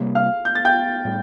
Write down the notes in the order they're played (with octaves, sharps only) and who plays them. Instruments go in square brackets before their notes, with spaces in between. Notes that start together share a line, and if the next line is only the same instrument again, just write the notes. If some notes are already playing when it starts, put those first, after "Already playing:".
Already playing: [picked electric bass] C3 G3 A#3
[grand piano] F5 F6
G6
A6
G5 G6
[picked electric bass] A2 G3